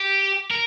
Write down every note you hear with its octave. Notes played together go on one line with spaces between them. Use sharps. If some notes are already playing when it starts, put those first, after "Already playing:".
Already playing: G4
A#4